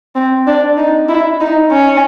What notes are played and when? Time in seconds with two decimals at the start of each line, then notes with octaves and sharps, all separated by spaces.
0.15 C4
0.47 D4
0.77 D#4
1.09 E4
1.40 D#4
1.71 C#4